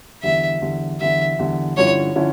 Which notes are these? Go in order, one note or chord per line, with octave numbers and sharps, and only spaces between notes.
E2 D3 G3 E5
E2 D3 G3
E2 D3 G3 E5
E2 D3 G3
G2 D3 F3 C#4 E4 C#5
D3 F3 C#4 E4